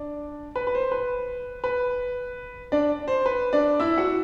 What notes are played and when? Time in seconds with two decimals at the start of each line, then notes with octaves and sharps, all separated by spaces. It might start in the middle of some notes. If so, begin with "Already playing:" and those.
Already playing: D4 D5
0.56 B4
0.67 B4
0.75 C5
0.92 B4
1.64 B4
2.72 D4 D5
3.08 C5
3.26 B4
3.53 D4 D5
3.80 E4 E5
3.98 F#4 F#5